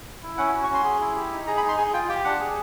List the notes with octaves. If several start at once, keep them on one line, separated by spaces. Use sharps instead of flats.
E4
C#4 F#5
F#4
C#6
C#4
C6
G#4
E4
G4
D#4
G#4 A#5
B5
D#4
C6
G#4 G#5
F4 G5
G4 G5
D4 F#5
G#4